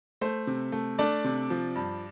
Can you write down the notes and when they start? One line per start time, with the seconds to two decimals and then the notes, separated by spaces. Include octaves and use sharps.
0.21 A3 C5
0.47 C3
0.72 A3
0.99 A3 D4 D5
1.24 C3
1.50 F3
1.75 G2